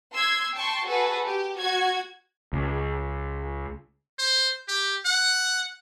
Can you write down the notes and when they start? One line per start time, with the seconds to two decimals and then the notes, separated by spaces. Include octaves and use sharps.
0.14 C6 E6 G#6
0.56 G5 A5 C6 C#6
0.85 F#4 G#4 A4 B4
1.26 G4
1.57 F#4 G#6
2.53 C#2
4.19 C5
4.68 G4
5.05 F#5